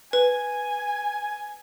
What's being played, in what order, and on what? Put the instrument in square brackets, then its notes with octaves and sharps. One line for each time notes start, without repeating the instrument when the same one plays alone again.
[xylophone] B4 [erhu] G#5